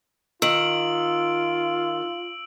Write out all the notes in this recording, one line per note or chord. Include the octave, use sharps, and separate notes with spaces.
D#3 F4 E6 D7 F#7